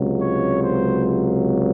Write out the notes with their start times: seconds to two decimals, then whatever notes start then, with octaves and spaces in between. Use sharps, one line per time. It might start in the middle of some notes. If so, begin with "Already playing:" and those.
Already playing: C#2 C3 F#3
0.21 C#5
0.62 C5